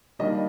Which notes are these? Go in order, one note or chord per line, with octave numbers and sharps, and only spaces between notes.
D#3 G3 A#3 D4 D#5